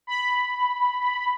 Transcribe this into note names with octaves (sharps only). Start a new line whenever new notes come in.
B5